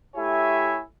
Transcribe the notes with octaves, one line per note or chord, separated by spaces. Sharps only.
A3 E4 G4 C#5 E5 G#5